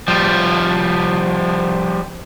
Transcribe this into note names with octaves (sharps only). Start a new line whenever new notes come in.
F3 G3